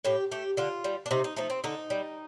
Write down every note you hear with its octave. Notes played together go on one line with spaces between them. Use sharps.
A2 G4
A3 G4
D3 F4
G3
D4
C3 D#4
D#4
F3 A3 D#4
C4
D3 D#4
G3